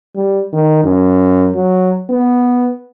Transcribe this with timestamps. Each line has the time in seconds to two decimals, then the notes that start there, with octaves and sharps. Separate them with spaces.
0.15 G3
0.53 D#3
0.84 F#2
1.55 F#3
2.10 B3